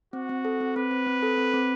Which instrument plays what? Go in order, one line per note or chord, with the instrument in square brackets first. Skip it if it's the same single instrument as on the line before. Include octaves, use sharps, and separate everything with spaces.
[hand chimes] C4 [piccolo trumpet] F#4
[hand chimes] C4
A4
C4
[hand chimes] C4 [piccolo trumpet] B4
[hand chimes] C4
C4
A4
C4
C4